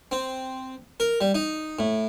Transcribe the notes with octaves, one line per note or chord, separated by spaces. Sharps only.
C4
A#4
G3
D#4
A2